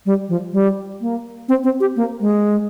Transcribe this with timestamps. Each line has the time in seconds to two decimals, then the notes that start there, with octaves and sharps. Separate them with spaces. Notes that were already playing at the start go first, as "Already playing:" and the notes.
0.06 G3
0.29 F3
0.53 G3
1.01 A#3
1.49 C4
1.64 C4
1.80 G4
1.96 A#3
2.21 G#3